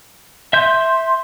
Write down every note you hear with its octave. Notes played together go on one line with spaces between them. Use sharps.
E5 C6 G6